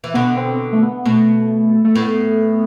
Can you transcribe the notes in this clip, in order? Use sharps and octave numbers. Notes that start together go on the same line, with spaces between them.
E3
B2 D3 B3
C4
A3
B3
B2 A3
A3
A2 B3